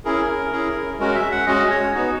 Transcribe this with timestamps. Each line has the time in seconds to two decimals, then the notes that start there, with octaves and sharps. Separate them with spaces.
0.05 C#4 E4 G#4 A#4
0.52 C#4 E4 G#4
1.00 G#3 C#4 F#4 A#4
1.15 E5
1.31 F#5
1.46 G#3 C#4 F#4 D#5
1.70 C#5
1.95 B3 D#4 F#4